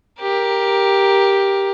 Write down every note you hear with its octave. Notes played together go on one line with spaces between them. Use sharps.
G4 A#4